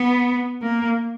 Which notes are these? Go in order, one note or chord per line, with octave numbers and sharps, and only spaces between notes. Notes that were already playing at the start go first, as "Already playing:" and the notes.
Already playing: B3
A#3